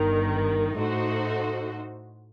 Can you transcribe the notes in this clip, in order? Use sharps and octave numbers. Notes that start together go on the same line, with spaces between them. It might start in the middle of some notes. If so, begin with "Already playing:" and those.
Already playing: G1 G2 D#3
A2 A3 D#4 F#4 C5